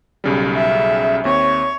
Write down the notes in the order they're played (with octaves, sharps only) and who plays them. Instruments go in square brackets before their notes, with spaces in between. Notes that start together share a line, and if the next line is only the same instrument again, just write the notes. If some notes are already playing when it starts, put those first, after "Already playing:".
[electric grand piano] B1 C#3 G3
[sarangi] E5
[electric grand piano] D#2 C4 [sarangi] C#5